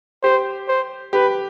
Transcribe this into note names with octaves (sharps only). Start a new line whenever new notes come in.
G4 C5
C5
G4 B4